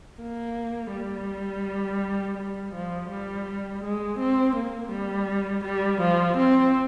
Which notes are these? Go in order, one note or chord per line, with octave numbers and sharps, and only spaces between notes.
A#3
G3
G3
F3
G3
G#3
C4
A#3
G3
G3
F3
C4